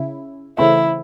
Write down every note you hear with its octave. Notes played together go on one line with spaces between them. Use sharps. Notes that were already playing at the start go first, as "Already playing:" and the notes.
Already playing: C#3 C#4 E4
C#3 E3 A3 C4 E4